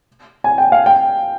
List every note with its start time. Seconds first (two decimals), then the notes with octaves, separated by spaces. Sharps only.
0.44 G#5
0.58 G5
0.72 F5
0.86 G5